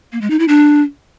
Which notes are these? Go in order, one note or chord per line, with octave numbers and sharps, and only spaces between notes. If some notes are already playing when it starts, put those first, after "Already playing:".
A#3
G#3
D#4
E4
D4